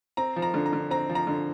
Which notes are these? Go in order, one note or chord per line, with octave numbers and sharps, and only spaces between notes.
C4 A#5
F3
A#5
D3
A#5
D3
C4 A#5
F3
A#5
D3